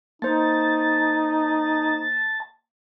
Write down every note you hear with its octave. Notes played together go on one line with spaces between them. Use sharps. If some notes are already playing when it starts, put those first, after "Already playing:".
A#3 D#4 C5 A5